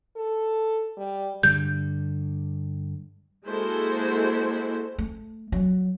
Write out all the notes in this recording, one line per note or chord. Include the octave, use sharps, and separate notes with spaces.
A4
G3
G2 D3 G3 G6
G#3 A#3 E4 F#4 A4 C5
A3
F#3